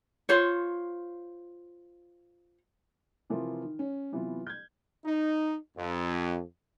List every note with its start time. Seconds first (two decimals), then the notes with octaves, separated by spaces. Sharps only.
0.29 F4 C5 C#5
3.30 C3 E3 F3 F4 A#4
3.64 D#3
3.79 C#4
4.12 C3 E3 F#3 B3 F4
4.47 G6 G#6
5.05 D#4
5.77 F2